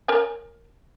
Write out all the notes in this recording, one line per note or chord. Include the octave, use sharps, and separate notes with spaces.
A#4 C#5 G#5